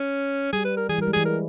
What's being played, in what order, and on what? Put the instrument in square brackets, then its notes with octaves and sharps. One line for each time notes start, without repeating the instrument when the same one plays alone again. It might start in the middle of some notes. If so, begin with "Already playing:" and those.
Already playing: [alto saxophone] C#4
[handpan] G3 [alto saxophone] G#4
[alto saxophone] B4
A#4
[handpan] E3 [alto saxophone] G#4
[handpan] G3 [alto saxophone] A#4
[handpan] G#3
[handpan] E3 [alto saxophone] G#4
[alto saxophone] A#4